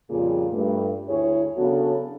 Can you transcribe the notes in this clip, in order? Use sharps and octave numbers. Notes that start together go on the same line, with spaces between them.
F2 A#2 C#3 G3 F4 G#4
G2 A3
D2 E4 G#4 C#5
C#3 F#3 B3 D4 F#4 A4